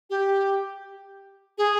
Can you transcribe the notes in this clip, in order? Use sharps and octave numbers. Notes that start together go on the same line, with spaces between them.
G4
G#4